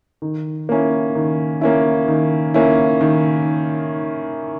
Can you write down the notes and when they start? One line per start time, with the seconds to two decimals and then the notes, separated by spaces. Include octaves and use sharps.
0.22 D#3
0.69 A#3 C#4 E4
1.15 D#3
1.61 A#3 C#4 E4
2.08 D#3
2.54 A#3 C#4 E4
3.01 D#3